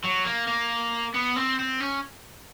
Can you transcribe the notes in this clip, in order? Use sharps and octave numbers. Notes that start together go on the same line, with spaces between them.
F#3
A#3
A#3
B3
C4
C4
C#4